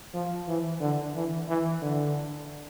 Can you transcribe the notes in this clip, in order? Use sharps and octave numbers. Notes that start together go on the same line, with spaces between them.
F3
E3
D3
E3
E3
D3